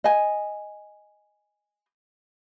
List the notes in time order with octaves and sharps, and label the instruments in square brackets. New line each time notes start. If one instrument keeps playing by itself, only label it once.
[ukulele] D#5 G#5